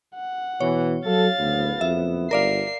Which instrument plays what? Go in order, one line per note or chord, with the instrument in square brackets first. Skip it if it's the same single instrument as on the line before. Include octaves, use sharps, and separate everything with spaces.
[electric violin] F#5
[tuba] B2 [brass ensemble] E3 [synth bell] C#5
[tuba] F#3 [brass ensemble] A4 [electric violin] F5 A6
[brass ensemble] F#1 B3 [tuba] D2
[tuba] F2 [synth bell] E5
[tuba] G1 [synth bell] A#4 D5 F5 [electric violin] C7